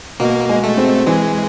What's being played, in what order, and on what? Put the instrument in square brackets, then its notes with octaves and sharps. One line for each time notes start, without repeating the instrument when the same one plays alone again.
[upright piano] B2 [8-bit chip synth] A#3
[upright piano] G#3
[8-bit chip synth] A3
[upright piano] C4
[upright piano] E3 [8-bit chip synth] G#3